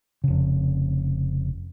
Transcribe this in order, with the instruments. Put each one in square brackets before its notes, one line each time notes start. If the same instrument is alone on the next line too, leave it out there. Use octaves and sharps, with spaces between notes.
[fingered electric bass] F1 C#3